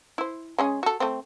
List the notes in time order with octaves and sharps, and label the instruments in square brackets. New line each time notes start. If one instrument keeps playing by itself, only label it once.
[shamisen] E4 C5
G#3 C#4 G#4
F#4 A4
A3 C4